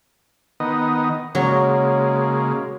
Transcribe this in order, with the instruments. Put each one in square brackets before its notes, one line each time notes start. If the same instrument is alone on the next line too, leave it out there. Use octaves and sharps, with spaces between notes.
[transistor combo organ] D#3 B3 D#5
[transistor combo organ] C#3 G#3 A#3 [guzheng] F#3